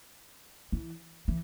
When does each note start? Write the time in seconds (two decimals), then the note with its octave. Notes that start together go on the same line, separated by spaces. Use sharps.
0.72 E3
1.28 E3